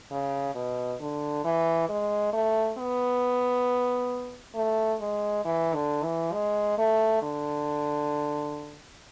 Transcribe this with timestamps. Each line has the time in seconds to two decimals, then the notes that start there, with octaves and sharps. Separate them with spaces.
0.11 C#3
0.55 B2
1.00 D3
1.44 E3
1.89 G#3
2.33 A3
2.78 B3
4.55 A3
5.01 G#3
5.45 E3
5.74 D3
6.03 E3
6.33 G#3
6.78 A3
7.22 D3